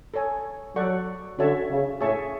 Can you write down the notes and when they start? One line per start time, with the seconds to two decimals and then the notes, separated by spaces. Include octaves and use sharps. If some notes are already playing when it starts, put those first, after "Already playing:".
0.14 A4 C#5 G#5
0.76 F#3 A4 D5 F#5 C#6
1.38 D3 C#4 F#4 C#5 E5 A5
1.70 C#3
2.01 A2 G#4 C#5 E5 A5 C#6